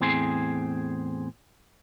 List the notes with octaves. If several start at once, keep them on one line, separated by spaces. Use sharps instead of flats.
E2 A2 C4 G#4 C5